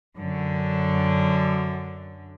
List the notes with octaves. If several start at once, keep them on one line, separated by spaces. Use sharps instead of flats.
F#2 D3